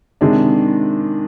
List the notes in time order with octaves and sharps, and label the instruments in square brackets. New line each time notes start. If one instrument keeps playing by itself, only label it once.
[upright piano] C3 D#3 G#3 D4